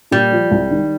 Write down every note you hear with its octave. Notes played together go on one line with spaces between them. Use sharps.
A#2 G3
F3
C2
D#3